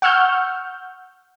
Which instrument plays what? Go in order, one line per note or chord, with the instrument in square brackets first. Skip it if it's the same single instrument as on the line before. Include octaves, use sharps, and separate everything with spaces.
[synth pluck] F#5 C#6 E6 F6 G6